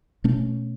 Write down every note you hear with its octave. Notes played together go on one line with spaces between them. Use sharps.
B2 A3 C#4